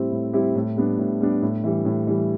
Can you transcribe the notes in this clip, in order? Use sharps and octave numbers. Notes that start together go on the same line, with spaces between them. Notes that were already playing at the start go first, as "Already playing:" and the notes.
Already playing: A2 G3 C4 E4 G4
A2
G3 C4 E4 G4
A2
G3 B3 D4
A2
G3 B3 D4
A2
E3 G3
A2
E3 G3